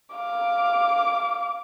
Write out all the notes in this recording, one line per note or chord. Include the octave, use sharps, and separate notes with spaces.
F5 D6